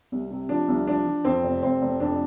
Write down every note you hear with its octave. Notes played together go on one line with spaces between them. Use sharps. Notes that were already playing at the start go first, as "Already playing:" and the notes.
C2
C3
F3 D4
C2
F3 D4
F3
F2 C4
F1
F1 C4
F1
F2 D4